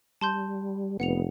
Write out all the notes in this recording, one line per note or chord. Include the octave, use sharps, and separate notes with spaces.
G3 A5 C6 G6
F1 B3 F#5 C#7 F7